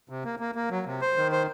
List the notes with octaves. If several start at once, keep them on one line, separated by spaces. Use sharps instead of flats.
C3
A#3
A#3
A#3
F#3
C3
C5
D#3
C5